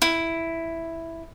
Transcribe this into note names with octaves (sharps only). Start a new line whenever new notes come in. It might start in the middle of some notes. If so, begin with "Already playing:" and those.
E4